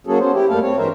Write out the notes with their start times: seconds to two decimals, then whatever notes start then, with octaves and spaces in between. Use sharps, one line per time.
0.07 F#3 A#3 C#4 F#4 G#4 A4
0.20 B3 C#4 C5
0.33 E4 G4
0.49 F#2 G3 A3 A#3 A4 F5
0.62 C4 C#5
0.77 G2 E3 G#3 A#4 C5 E5